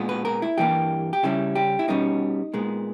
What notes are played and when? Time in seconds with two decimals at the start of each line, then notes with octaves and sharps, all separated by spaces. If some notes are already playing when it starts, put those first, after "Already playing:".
Already playing: A#2 G#3 B3
0.09 B4
0.25 A#4
0.42 E4
0.58 G2 E3 G3 A#3 G4
1.13 G4
1.23 C#3 G3 C#4 E4
1.55 G4
1.79 E4
1.88 B2 G3 A#3 C#4 D#4
2.54 A#2 G#3 B3